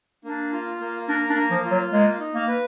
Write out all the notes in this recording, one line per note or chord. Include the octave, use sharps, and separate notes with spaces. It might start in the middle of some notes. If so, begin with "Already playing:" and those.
A#3 D4
F4
A#3
D4 A#4
D4
A#3
F3
F4
F#3
G#3 A#3
D#4
A#3
B4